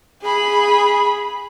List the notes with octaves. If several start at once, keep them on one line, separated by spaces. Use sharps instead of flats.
G#4 B5